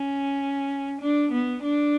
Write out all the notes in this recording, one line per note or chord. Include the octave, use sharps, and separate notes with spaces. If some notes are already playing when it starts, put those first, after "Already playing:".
Already playing: C#4
D4
B3
D4